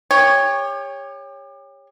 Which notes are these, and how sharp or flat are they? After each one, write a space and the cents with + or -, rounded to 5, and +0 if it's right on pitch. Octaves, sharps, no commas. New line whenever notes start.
G4 +35 C#5 +0